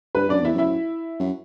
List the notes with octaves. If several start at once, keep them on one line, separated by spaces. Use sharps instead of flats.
G2 B4
F#2 D4 D5
E2 E4 E5
F#2 E4 E5
F#2